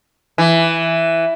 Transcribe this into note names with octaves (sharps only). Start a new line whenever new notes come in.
E3